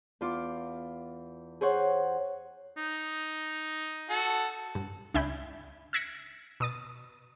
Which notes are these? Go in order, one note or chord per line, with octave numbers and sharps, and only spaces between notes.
E2 F4 D6
G#4 C5 C#5 F#5
D#4
F#4 A4
G2
C#2 D4 E5 G5 G#5 B5
E6 F#6 G#6 A#6 B6 C#7
B2 D#6 A6